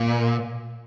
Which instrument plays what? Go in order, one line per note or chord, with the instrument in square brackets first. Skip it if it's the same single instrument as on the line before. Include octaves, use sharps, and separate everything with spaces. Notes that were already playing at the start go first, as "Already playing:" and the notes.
Already playing: [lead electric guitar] A#2